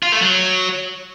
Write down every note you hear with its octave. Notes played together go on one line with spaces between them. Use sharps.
F4
A3
F#3